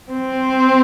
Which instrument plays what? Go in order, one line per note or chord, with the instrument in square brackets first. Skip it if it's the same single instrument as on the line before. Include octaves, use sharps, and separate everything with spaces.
[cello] C4